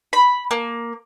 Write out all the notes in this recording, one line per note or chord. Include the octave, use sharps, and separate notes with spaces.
B5
A#3